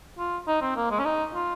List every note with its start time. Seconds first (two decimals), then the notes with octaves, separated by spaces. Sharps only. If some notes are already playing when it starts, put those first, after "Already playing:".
0.18 F4
0.47 D#4
0.61 C4
0.76 A#3
0.91 G#3
0.99 C#4
1.05 D#4
1.34 F4